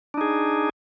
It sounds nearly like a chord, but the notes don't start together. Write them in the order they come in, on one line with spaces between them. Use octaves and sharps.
D4 D#4 G#4